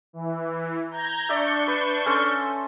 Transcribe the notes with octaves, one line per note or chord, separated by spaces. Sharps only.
E3
A#5 G6 G#6
D4 D5 E5 C#6 G6
B4
C#4 A4 C5